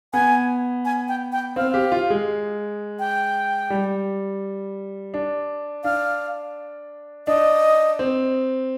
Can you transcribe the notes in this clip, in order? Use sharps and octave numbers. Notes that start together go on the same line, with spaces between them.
B3 G#5
G#5
G5
G5
C4 F5
G4
F4
G#3
G5
G3
D4
D4 F5
D4 D#5
C4